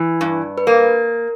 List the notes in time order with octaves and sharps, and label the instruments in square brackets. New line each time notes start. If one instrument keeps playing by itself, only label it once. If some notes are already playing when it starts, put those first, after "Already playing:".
Already playing: [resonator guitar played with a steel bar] E3
G2
[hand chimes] B4
[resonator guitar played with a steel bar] A#3 [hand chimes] A#4